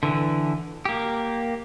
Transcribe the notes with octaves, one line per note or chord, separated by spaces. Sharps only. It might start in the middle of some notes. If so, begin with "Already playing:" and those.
D3 E3
A#3 G4